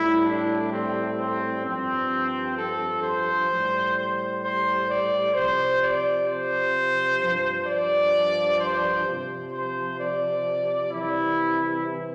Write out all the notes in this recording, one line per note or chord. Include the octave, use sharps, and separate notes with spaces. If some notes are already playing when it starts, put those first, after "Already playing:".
Already playing: A2 G3 E4
D4
C4
C4
G2 F3 C4
A4
C5
A2 G3
C5
C5
D5
C3 F3 C5
D5
C5
G2 F3
D5
C5
C3 F3
C5
D5
C3 E3 G3 E4